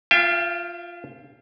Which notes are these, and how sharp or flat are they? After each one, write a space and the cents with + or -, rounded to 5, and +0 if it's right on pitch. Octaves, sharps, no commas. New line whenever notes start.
F4 +0 E5 +45 G5 +25